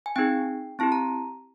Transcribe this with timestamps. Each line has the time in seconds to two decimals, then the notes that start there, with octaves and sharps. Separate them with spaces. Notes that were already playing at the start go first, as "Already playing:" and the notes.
0.06 G#5
0.16 C4 D#4 G#4 G5
0.79 C4 E4 G4 A5
0.92 A#5